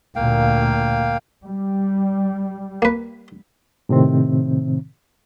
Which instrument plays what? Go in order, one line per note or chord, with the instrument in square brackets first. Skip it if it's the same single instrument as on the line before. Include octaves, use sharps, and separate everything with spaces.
[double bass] D2 A#2 [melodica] A#3 F5 G5
[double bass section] G3
[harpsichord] A#3 B4
[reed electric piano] A2 C3 D#3 C4